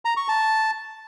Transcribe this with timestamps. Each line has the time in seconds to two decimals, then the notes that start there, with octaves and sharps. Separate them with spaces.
0.05 A#5
0.17 C#6
0.28 A5